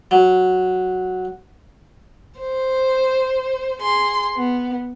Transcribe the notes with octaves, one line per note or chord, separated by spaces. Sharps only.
F#3
C5
G#4 C6
B3